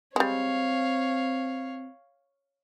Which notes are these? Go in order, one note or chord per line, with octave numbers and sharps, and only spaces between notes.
G3 G#3 C4 C#5 F5